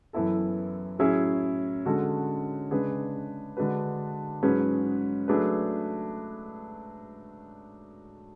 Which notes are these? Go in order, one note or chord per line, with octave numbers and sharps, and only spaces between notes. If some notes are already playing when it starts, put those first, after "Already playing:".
F#2 E3 B3 E4 A4
A2 F#3 C#4 E4 G#4
D3 G#3 C#4 F#4 A4
C#3 G#3 D4 G#4 B4
D3 G#3 D4 F#4 B4
G#2 F#3 C#4 G#4 B4
F#3 A3 D4 G#4 B4